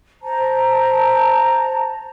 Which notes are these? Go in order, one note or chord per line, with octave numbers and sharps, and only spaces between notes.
C5 A5 A#5